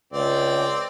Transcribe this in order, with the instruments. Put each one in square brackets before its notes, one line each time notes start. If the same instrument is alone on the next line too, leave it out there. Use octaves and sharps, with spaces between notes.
[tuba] C#2 [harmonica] C4 D5